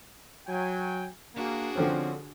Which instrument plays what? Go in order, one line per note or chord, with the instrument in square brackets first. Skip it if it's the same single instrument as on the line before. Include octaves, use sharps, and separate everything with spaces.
[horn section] F#3 G5 G#5
[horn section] A#3 [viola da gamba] D4 F#4 G#4
[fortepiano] D3 F3 C#4 [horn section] C4